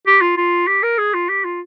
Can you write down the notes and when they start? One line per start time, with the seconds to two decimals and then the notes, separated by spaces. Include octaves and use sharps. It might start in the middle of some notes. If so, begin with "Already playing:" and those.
0.07 G4
0.21 F4
0.37 F4
0.67 G4
0.83 A#4
0.98 G#4
1.14 F4
1.29 G4
1.45 F4